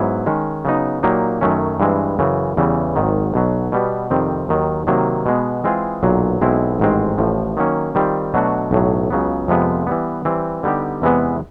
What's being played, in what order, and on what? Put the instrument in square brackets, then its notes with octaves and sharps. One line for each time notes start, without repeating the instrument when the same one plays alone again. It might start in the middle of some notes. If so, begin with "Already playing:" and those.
Already playing: [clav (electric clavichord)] G#2 F#3 B3 E4
D#3 G#3 C#4
C#3 F#3 B3 D#4
A#2 F#3 A#3 D#4 G4
F#2 D#3 F#3 A3 C#4
G2 E3 G#3 C4
F#2 C#3 E3
E2 C#3 E3 G3
G#1 G#2 D#3 F#3
B1 B2 F#3
B2 G3 B3
F2 C3 D#3 G3 C4
D#2 D#3 F#3
C3 D#3 F#3 A#3
B2 G#3 B3
E3 G#3 C4 F4 G#4
B1 A#2 F#3
B1 B2 G#3 C4 E4
A1 G#2 D#3 G#3 C4
A1 A2 F3
D#3 F#3 A#3 C#4
D#3 G3 C4 F4
B2 F#3 A3 D4 F#4
B1 A2 F#3
C#2 C#3 F#3 B3
F2 C3 F3 G#3 B3
E3 G3 B3
E3 G3 C4
D3 G3 B3 D#4 G4
E2 C3 E3 G#3 B3